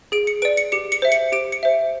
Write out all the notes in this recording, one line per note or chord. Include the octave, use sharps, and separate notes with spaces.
G#4 D7
C#7
B4 D5 D7
C#7
G4 C#7
C#7
C5 E5
C#7
G4 D7
C#7
C5 E5